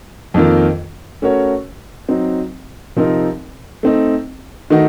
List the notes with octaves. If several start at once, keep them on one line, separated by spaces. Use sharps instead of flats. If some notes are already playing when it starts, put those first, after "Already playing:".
F2 D#3 A#3 F4
A3 C#4 F#4 A#4 C#5
F#3 C4 D#4
C3 F3 C4 D#4 A#4
A3 C4 D#4
D#3 A3 D#4 F#4